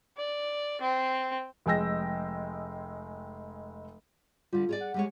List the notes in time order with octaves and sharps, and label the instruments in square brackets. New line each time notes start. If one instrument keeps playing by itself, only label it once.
[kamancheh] D5
C4
[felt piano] F1 G#3 G5 E6 A#6
[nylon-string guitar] D3 G3 [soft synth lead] F4
[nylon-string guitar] G#4 C#5 D5
[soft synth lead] F#5
[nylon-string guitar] G3 G#3 C#5